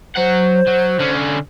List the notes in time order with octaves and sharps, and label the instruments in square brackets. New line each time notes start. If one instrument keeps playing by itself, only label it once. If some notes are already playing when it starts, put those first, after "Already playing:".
[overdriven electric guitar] F#3 F#5 [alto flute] C5
[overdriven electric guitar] F#3
D3 C#4